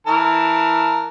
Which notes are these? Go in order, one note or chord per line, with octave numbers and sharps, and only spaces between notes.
E3 A#4 A5